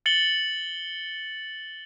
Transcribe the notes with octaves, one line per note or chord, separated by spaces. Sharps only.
A6 C#7 F#7 G7